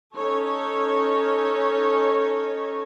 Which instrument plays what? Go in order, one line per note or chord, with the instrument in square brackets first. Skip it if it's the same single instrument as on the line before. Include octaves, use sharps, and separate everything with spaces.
[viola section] C#4 D#4 A4 C#5